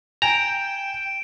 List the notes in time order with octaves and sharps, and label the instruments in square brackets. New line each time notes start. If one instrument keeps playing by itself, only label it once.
[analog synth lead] G5 [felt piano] G#5 [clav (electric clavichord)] A#5 [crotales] D7 E7